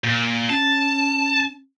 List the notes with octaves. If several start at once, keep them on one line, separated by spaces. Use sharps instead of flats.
A#2
C#4 A5